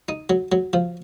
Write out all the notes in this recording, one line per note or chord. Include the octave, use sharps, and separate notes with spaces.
D#4
F#3
F#3
F3